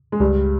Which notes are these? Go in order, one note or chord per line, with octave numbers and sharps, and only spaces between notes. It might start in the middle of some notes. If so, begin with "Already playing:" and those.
G#3
C#2 G2 G3